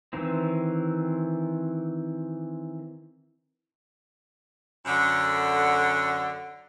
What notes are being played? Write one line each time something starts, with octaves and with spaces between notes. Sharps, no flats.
D#3 E3 C4
F#2 D3